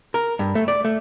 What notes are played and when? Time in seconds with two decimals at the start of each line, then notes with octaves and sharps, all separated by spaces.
0.14 A#4
0.39 G2
0.55 A3
0.68 D5
0.85 A3